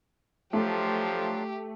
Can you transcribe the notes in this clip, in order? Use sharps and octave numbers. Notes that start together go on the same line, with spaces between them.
F3 F#3 A3 D4 F4 G4